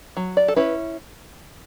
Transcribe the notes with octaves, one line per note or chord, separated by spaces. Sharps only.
F#3
D5
A4
C#4 E4 B4